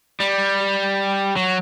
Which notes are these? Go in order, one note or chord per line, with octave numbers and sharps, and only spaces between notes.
G3
F#3